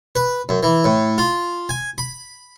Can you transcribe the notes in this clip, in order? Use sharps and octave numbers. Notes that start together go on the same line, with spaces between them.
B4
F#2
E3
A2
F4
G#5
B5